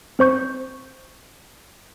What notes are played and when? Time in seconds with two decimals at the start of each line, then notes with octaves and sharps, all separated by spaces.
0.19 C4 C5 C#6 G6